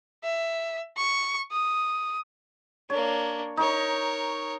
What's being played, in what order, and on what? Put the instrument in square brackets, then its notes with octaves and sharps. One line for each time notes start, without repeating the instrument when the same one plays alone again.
[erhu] E5
C#6
D#6
[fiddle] A#3 D4 [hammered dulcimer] C#5
[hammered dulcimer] D#4 C#6 [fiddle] A#4 C#5